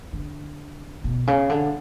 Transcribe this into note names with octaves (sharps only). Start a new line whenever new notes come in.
D3
B2
C#3
D3